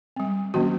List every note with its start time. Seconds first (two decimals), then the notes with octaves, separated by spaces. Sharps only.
0.16 G3 C4
0.54 D#3 F#3 A#3 C#4 F#4